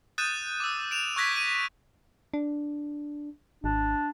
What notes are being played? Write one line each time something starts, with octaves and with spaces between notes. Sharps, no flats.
D#6 F#6 G6 A6 D#7 E7
D6 E6
D7 E7 F7
C#6 E6 F#6 G#6 A#6 B6
D#7
D4
G#1 D4